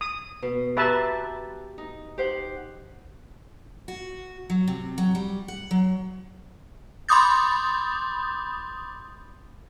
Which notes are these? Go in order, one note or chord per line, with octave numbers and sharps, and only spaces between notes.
D#6
B2
G4 B4 E5 A5 A#5
D#4
G4 C5 F#5
F#4
F#3
C3
F#3
G3
F#5
F#3
B5 C6 D6 D#6 G6 A6